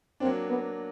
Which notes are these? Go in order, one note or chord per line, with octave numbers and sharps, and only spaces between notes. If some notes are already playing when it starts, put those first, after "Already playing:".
F#3 A#3 C4 D4
B3